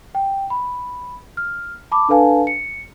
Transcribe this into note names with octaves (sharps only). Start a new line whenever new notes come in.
G5
B5
F6
A5 B5 D6
D4 A4 B4 F5 G#5 A5
C#7